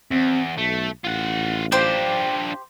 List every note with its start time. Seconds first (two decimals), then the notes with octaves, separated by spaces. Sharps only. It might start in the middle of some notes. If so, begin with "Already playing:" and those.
0.11 E2 C4
0.58 B1 A3
1.05 A1 F4 F#5
1.72 D4 F4 G4 C5 C6